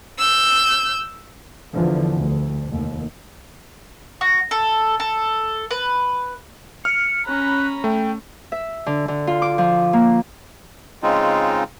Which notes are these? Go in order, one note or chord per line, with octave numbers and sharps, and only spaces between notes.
E6 G6
E2 D3 E3 F3
D2
F1 D#2
F#4
A4
A4
B4
F6 C#7
C#4 A#5 B5 F#6
A3 G5
E5
D3
D3
F4
D6
F3
A#3
C#3 G#3 C4 D#4 F4